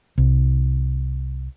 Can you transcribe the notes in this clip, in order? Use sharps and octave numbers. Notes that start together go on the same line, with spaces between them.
C2